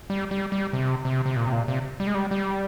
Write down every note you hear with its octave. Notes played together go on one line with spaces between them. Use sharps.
G3
G3
G3
C3
C3
C3
A#2
C3
A#2
C3
G3
G#3
G3
G3